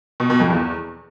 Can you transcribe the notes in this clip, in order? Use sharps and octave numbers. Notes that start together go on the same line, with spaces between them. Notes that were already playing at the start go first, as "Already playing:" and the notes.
B2
B2
F2
E2